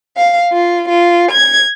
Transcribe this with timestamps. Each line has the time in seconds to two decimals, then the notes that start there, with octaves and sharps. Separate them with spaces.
0.17 F5
0.52 F4
0.88 F4
1.30 G#6